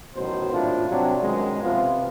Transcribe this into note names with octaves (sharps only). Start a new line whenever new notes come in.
A1 B2 D#3 F#3 C5
G#1 A2 D4 F4
C3 F#3 G3 C4 D4
F#2 B2 D#3 G#3
C3 F3 B3 F4